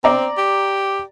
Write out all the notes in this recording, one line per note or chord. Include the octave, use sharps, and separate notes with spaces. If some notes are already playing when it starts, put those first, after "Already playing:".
C4 D5 A#5
G4